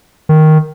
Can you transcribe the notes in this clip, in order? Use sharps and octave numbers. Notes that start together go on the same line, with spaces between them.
D#3